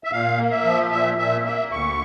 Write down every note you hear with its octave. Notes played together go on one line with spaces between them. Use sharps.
E5
A#2 F5
A#3
E5
F3
A#2 E5
A#2 E5
A#3 E5
D2 C#6